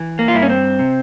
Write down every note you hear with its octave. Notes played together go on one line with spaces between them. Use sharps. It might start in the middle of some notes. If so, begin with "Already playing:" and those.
Already playing: E3
A#3
F4
G2 E4
C#4
C4
C3